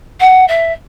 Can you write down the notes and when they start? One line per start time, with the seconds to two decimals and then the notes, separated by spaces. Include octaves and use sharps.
0.20 F#5
0.48 E5